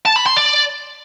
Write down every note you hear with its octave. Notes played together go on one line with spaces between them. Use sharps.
A5
B5
C6
D5